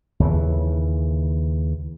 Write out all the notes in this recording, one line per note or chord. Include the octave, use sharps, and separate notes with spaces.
D#2 C#3 E3